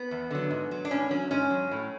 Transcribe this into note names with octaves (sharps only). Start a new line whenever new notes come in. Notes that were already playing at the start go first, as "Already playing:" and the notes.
Already playing: B3
E2
D3 F#3
G#2
F#3
D4
A2 C#4
F#3 C#4
G#2 C#4
F#3
A2